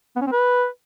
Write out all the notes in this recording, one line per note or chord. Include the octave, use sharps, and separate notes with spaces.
B3
C#4
C4
B4